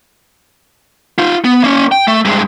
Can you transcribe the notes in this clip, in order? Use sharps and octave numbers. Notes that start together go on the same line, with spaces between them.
D#4 F4
B3
A#3 C#4
G5
A3
G2 G#3